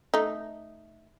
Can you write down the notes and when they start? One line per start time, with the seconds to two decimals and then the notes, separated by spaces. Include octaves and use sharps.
0.14 A3 D#4